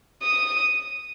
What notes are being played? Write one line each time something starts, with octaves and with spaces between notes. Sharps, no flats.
D#6